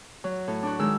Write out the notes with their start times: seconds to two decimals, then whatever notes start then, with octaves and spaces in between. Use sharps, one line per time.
0.24 F#3
0.48 A2
0.63 D4 F#4
0.79 D#3 G#3 E6